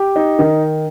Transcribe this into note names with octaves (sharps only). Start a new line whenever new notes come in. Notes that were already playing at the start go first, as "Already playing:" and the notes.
Already playing: G4
D#4
D#3